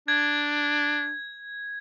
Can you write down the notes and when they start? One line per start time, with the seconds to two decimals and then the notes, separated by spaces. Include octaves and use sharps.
0.08 D4 G#6